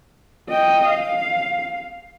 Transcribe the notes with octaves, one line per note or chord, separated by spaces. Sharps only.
D#5 G5
F5